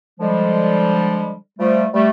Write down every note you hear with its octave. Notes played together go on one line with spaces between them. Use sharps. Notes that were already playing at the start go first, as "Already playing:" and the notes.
D3 F3 G3 G#3
F3 G3 A3
G3 A3